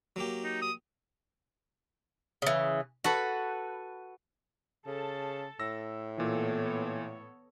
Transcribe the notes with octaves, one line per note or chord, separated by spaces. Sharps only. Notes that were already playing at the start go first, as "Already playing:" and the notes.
F#3 A#3 G4
D#4
D#6
C#3 E3
F#4 A4 B4 F#5
C#3 A4 A5
A2 E6 A#6
A#2 E3 B3 A4 C#5